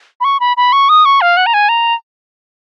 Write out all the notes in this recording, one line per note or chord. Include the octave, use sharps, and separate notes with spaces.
B5
C#6
B5
B5
C#6
D#6
C#6
F5
F#5
A#5
G#5
A#5